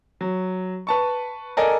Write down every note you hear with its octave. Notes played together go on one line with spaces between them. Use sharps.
F#3
B4 A5 C#6
A4 A#4 D5 D#5 G#5